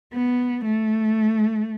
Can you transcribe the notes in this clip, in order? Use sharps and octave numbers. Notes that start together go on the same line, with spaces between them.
B3
A3